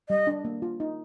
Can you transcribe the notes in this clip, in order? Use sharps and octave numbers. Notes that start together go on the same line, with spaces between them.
G3 D#5
D4
A#3
F4
D#4